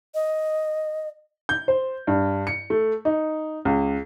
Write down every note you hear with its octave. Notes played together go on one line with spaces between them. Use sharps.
D#5
G6
C5
G2
C#7
A3
D#4
C#2